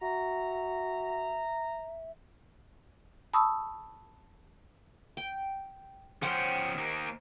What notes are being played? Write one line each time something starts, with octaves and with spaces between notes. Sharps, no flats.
F#4 E5 A#5
A5 B5 C#6 D#6 E6
G5
F3 C#4 C5 F#5 G5
D#2 A#3